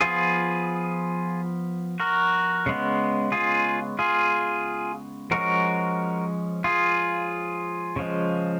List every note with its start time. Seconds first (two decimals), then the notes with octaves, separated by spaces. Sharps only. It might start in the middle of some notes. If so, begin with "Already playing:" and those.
0.01 F3 B3 F4 G#4
2.00 F#4 A#4
2.66 C#3 G#3 B3
3.32 F4 G#4
3.99 F4 G#4
5.31 F3 G#3 C#4 F#4 A#4
6.64 F4 G#4
7.96 C#3 F3 G#3